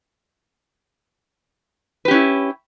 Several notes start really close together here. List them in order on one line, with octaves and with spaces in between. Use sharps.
B4 G4 C#4 E4